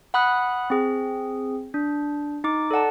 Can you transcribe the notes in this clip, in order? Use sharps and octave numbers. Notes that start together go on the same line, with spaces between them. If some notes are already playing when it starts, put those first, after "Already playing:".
F#5 B5 D#6 F#6
C4 G#4
D4
D#4 D6
A4 D5 F#5 A5